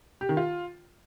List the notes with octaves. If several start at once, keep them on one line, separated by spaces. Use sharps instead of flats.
G4
D#3
F4